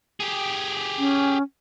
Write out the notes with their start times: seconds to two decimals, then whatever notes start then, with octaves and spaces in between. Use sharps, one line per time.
0.20 G4 G#4
0.99 C#4